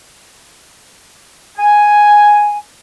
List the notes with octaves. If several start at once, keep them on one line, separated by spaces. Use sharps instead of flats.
G#5